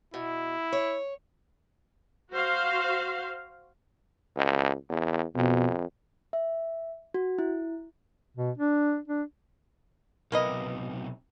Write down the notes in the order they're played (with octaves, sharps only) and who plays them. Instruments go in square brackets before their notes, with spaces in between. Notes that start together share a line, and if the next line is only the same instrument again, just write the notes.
[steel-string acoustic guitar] B2 [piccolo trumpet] E4
[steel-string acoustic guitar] C#5
[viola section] F#4 C5 F5
[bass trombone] C#2
E2
[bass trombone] F2 [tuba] B2
[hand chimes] E5
F#4
E4
[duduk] B2
D4
D4
[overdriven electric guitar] B1 C3 [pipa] A#3 B4 D#5